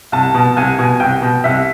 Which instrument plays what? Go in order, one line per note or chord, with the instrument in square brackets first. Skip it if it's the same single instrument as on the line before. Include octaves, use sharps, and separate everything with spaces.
[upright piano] C2 A5
B2
C2 G#5
B2
C2 G5
B2
C2 E5